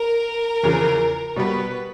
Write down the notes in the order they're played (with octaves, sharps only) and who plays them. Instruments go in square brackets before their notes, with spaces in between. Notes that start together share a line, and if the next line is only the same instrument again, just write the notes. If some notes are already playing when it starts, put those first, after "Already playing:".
Already playing: [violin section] A#4
[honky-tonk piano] E2 C#3 F3
[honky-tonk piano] B2 G3 B3 [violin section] B4